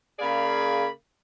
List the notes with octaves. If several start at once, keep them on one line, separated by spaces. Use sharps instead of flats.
C#3 A#3 G#4 D5 F5 B5